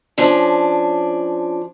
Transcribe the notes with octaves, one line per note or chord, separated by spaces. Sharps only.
F3 C#4 D4